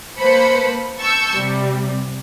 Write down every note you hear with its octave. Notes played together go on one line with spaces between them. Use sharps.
A#3 B4 C5 A5 B5 C#7
A5 C#6 E6 G6
C3 G3